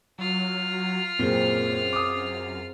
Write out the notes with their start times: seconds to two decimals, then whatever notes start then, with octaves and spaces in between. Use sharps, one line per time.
0.19 F#3 F4 F6
1.19 F#2 A#2 C4 G#4
1.93 D6 D#6